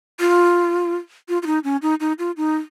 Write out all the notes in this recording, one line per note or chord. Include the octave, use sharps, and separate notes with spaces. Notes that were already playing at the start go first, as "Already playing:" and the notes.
F4
F4
F4
D#4
C#4
D#4
D#4
F4
D#4